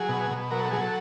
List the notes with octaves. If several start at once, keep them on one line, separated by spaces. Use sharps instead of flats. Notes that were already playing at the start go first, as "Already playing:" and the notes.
Already playing: F#3 G#4
B2
B2
F#3 A#4
A4
F#3 G#4
A4